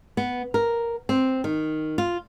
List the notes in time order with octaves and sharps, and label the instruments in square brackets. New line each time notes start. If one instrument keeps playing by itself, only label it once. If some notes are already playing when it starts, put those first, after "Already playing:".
[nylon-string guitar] B3
A#4
C4
D#3
F4